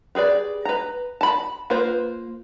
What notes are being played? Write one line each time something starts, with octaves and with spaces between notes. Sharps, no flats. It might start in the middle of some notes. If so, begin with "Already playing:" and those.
G4 G#4 B4 D5
B4 A#5
A5 B5
A#3 F4 B4 C5